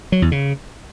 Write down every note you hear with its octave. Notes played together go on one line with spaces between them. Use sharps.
F#3
E2
C#3